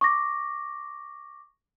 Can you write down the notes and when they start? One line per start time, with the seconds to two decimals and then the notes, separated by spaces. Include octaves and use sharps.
0.01 C#6 D6 A#6